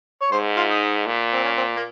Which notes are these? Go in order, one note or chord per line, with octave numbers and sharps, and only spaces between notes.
C#5
G#2 C5
F4
D#4
A#2
C4
C#4
C4
A#3